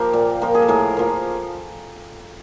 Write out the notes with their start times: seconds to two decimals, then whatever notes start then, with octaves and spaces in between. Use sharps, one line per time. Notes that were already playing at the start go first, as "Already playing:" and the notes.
Already playing: F3 A#3 G4
0.13 A#2
0.42 F3 A#3
0.54 G#4
0.62 A4
0.68 A2 G#4 A#4
0.97 F3 A#3